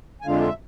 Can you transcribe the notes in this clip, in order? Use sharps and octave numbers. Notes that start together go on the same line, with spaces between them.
G#5
F2 D3 G#3 D4 F4 F5
E5